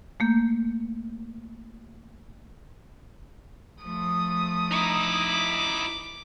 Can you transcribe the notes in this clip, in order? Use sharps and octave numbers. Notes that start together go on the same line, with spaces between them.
A3 A#3 G6
F3 A3 D#6
D#4 E4 D6